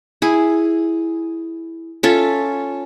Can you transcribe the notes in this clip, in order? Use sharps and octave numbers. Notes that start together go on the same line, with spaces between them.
E4 G#4
C#4 F4 A4 E5